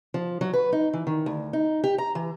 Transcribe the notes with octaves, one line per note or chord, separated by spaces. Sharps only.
F3
F#3
B4
D#4
E3
D#3
D2
D#4
G4
A#5
E3